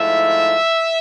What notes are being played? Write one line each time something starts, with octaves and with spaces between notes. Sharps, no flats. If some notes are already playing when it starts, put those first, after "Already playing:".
Already playing: G#2 F3 A3 E4 E5